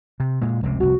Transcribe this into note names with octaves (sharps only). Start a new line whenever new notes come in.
C3
A#2 G#3
F1 C#2 C3
F1 C2 F#4